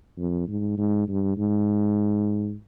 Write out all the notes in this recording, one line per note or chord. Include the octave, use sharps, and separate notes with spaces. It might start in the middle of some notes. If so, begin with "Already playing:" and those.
F2
G#2
G#2
G2
G#2